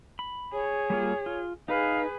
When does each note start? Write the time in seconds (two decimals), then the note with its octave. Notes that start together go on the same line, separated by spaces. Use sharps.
0.19 B5
0.53 G#4 C#5
0.90 G3 A#3 F4
1.26 F4
1.68 D#4 G#4 B4 F5